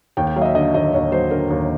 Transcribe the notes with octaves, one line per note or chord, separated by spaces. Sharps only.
D#2 G5
G5
F#3 F5
D#5
E5
D3 D#5
D#2 D#5
D#2 C#5
F#3 C5
D3 A#4
D#2